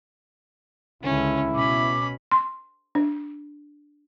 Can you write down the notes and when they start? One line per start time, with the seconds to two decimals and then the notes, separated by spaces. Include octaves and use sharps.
1.03 C#2 D3 C#4 E4
1.55 B2 C#4 B5 D6
2.31 C6
2.95 D4